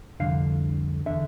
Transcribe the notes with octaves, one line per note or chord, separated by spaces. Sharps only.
C2 F2 D3 F5
E2 D3 E5